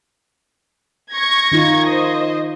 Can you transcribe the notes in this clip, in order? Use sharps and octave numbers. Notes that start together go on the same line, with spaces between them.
C#6 G#6 A#6
D#3 D#4 F4
C5 D#5